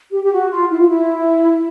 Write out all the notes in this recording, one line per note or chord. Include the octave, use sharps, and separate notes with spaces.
G4
G4
F#4
F4
E4
F4
E4